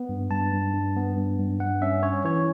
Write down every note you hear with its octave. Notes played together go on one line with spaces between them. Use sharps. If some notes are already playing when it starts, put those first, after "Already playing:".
Already playing: B3
G2
G2 A5
G2
G2
B3
G2
G2
G2 F#5
C#4 E5
C#4 C#5
E3 C#5